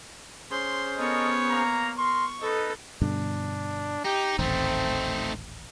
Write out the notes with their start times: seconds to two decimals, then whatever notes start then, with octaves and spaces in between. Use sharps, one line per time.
0.51 C#4 G#4 C5 C6
0.98 B3 A4 A#4 C#5 D#5
1.50 A#3 A#5
1.98 A#4 C6 C#6
2.41 D#4 A4 B4 D#5
3.02 G2 B2 D3 D4
4.05 D#4 G4
4.39 D#1 A1 A3 C4 D#4